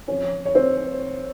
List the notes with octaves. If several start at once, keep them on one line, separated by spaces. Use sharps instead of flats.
F3 C4 C#4 C#5
C#5
C4 C5